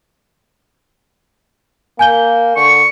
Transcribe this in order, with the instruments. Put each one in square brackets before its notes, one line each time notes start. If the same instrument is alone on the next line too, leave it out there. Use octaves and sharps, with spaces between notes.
[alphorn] A#3 [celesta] G#5 G6 G7
[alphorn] D3 [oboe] C#6